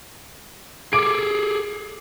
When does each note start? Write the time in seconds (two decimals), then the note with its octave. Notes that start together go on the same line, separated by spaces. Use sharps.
0.93 G#4 A4 D6 D7